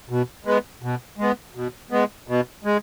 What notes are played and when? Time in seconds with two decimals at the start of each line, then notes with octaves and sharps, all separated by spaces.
0.10 B2
0.45 G#3 B3
0.82 B2
1.18 G#3 B3
1.55 B2
1.91 G#3 B3
2.28 B2
2.65 G#3